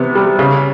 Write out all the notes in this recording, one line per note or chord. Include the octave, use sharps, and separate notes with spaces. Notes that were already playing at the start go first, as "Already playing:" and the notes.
Already playing: C3 E3 B3
G3
C#3